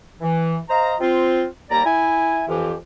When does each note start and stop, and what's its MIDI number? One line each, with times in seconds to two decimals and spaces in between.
0.21 0.58 52
0.69 0.95 72
0.69 0.95 75
0.69 0.95 77
0.69 0.95 82
1.01 1.45 60
1.01 1.45 65
1.70 1.83 39
1.70 1.83 55
1.70 1.83 58
1.70 1.83 74
1.70 1.83 82
1.85 2.43 64
1.85 2.43 80
2.48 2.74 41
2.48 2.74 52
2.48 2.74 67